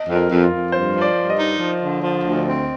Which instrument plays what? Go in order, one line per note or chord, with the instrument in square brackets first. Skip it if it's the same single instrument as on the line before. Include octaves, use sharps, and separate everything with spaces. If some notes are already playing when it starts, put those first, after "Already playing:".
Already playing: [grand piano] D#5
[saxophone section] F2
[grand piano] A#4
[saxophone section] F2
[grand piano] F4
[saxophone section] F2
[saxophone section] G2 [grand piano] C5
[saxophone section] F3
[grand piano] D5
[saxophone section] G2
[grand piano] D#5
[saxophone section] D#4
F3
D3
F3
D2
C4